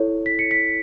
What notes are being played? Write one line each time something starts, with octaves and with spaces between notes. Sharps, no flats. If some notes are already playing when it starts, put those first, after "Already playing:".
Already playing: E4 A4 C#5
B6
C#7
B6